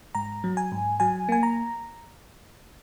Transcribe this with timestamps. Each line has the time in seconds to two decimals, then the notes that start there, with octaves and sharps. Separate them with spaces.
0.15 G#2 A#5
0.44 F#3
0.57 G#5
0.72 G#2
1.00 F#3 G#5
1.29 A#3 G#5
1.43 A#5